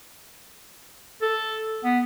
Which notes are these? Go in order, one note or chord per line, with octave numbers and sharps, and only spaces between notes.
A4
B3